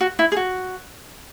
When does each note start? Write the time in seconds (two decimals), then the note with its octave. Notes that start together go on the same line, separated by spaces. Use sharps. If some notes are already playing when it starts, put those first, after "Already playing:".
0.01 F#4
0.19 E4
0.32 G#4
0.37 F#4